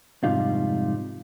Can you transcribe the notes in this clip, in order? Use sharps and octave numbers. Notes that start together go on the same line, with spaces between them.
F2 G#2 C3 G3 D#4 F4